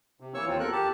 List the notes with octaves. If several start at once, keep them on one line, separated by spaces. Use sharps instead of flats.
C3
E3 A#3 C#5 C#6 E6
D#2 C4 F4
E2 A4 A#4 F#6
G4 A5